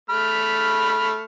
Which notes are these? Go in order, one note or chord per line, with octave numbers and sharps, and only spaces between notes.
A3 B5 F6